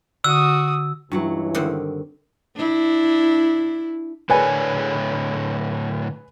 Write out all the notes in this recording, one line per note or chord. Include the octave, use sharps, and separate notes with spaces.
D3 F#4 D#6 E6
C#2 G2 E3 F#3 F#5
D3 D#3 C4
D4 E4
A2 D3 G#4 A#4 B4 C#5 D5 G#5